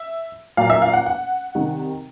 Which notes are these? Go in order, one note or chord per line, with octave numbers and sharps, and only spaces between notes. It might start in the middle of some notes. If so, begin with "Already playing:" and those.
Already playing: E5
A#2 F#3 A#3 F5
E5
F5
F#5
F#5
C3 D#3 G3